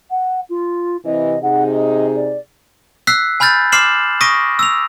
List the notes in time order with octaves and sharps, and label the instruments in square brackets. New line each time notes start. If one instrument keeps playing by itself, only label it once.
[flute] F#5
F4
[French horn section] C3 E3 [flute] D#5
[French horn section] C3 D#4 G#4 [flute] F#5
[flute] D#5
D5
[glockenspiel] E6 F#6 B6 C7
G#5 B5 F6 G6 A6
C6 D6 F6 C7 E7 F#7
C#6 D#6 A#6 B6 D7 D#7
E6 F7